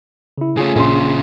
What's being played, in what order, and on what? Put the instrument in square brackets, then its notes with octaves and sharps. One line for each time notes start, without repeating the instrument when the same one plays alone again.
[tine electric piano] C#3 E4
[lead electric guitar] C#3 A3 [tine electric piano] C#4 F4 G#4
[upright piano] A#1 C6 [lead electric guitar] A#2 C#3